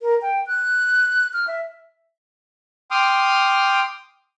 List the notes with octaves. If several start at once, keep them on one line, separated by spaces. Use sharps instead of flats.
A#4
G5
F#6
F6
E5
G5 C6 D6 D#6 F6